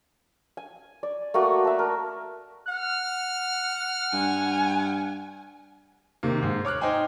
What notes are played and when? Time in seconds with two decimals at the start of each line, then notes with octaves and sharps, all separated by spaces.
0.57 G#5
1.03 D5
1.34 A3 A#3 F#4 G#5
1.65 E5 A5
1.79 A#4
2.68 F#5 F6
4.13 G2 G#5
6.23 C3 D#3 A#3
6.43 G#2
6.65 C#5 D6 F6 F#6
6.81 D#4 C5 G5 G#5